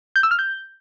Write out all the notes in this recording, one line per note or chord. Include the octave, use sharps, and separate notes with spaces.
G6
E6
F6
G6